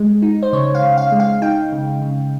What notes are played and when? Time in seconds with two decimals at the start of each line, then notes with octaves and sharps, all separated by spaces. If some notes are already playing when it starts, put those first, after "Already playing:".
Already playing: G#3
0.22 D#4
0.43 C5
0.53 C#3 C#5
0.75 F5
0.82 C#3
0.98 F5
1.12 G#3
1.20 F5
1.42 D#4 G5
1.72 C#3
2.02 C#3